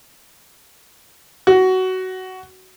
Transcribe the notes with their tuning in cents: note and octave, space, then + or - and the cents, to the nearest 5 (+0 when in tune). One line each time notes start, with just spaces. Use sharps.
F#4 +15